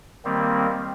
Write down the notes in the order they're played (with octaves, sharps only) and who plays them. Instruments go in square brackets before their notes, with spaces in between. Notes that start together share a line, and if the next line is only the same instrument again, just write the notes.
[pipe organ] D#3 G3 A#3 C4